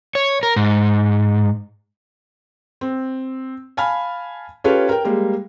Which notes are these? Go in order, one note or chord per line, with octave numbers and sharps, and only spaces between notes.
C#5
A#4
G#2
C4
F5 G#5 A5 B5 F6
C#4 F4 G4 A4 B4 C#5
A#4 G5
G3 G#3 A#3